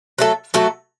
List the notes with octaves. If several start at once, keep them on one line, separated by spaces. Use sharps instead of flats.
F#3 A3 F#4 A4
F#3 A3 F#4 A4